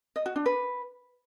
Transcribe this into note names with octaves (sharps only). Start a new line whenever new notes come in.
D#5
F#4
D4
B4